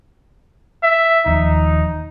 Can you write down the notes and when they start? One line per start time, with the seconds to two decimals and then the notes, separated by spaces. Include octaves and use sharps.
0.83 E5
1.26 D#1 D#2 F3 D#4